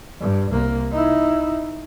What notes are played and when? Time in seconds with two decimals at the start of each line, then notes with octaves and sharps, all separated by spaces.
0.21 G2
0.50 C2 A#3
0.92 D#4 E4